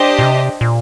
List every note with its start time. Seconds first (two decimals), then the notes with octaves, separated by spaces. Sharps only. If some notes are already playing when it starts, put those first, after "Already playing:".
Already playing: D4 G4 C5 D#5
0.19 A#2
0.23 C3
0.61 A#2